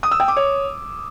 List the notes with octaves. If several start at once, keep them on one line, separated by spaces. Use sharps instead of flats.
D#6
E6
G5
D6
C#5